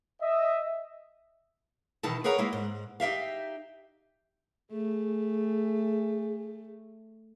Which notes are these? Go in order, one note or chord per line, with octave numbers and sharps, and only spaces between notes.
D#5 E5
B2 D#3 E3 D#4 E4 A5
G#4 A#4 B4 C#5 F#5 A#5
G#3 A#3 E4
G#2
D#4 G4 E5 F5
A3 G#4